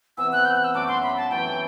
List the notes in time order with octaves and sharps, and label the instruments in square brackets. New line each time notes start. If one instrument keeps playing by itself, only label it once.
[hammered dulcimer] C3 E3 B3 [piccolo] E6
[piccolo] F#6
G6
F#6
E6
[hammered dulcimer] F#2 F#3 A3 [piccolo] D6
[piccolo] C6
B5
A5
[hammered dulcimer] F#2 E3 A3 E4 [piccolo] G5